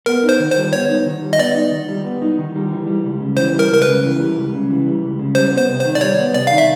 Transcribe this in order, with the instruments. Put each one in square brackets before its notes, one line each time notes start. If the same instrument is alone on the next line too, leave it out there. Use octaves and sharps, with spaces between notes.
[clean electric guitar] B3 [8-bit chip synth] A#4
[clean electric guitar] D#4
[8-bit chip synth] C5
[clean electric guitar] D#3
[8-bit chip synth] C5
[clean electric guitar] G3
[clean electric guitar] B3 [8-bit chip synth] C#5
[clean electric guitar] D#4
D#3
G3
[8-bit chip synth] D#5
[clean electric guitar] B3 [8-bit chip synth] D5
[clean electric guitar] D#4
D#3
G3
B3
D#4
D#3
G3
E3
G3
C#2
C#3
[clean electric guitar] E3 [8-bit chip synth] C5
[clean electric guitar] G3 [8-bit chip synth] A#4
[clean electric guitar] C#2 [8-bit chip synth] A#4
[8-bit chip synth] B4
[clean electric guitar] C#3
E3
G3
C#2
C#3
E3
G3
C#2
C#3
[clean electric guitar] G3 [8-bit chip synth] C5
[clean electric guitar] B3 [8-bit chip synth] C5
[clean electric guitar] C3
[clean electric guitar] D#3 [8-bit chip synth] C5
[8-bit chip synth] D5
[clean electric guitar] G3 [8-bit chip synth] C#5
[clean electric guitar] B3
[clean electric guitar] C3 [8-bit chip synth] D5
[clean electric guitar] D#3 [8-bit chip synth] F5
[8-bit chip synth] E5